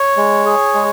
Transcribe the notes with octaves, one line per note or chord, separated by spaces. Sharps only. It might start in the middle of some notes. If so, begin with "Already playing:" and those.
Already playing: C#5
G#3
G#4
G#3